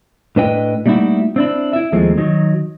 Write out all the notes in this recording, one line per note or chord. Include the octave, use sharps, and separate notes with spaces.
A2 D4 B4 D#5 G5
G3 A3 A#3 D#4 E4 F#4
C4 D4 E4
E4 E5
D#2 F3 G#3 A3 C4
D#3 F#3 D#4